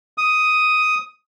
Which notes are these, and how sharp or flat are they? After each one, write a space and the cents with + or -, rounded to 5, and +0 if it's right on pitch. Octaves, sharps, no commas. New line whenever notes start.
D#6 +5